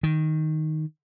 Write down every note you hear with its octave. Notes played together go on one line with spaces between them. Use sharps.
D#3